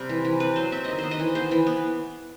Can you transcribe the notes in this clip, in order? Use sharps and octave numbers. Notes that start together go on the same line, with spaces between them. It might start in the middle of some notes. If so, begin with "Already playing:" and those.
Already playing: C3 G3
E3
E3
C4 B4
F#3 C5
C4 E5
D#3 D#5
B3 C5
D#5
E3
B3 C5
E3
B3